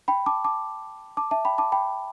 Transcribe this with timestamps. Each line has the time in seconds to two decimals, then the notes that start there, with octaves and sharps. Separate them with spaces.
0.08 G5 B5
0.26 A5 D6
0.44 A5 D6
1.17 A5 D6
1.31 E5 A5
1.45 G5 B5
1.58 A5 D6
1.72 G5 B5